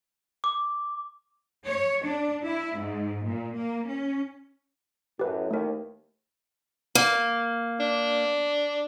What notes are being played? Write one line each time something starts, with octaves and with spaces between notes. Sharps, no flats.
D6
C#5
D4
E4
G#2
A#2
A#3
C#4
F#2 A2 G4 B4
A1 D#2 A3 A#4
A#3
D4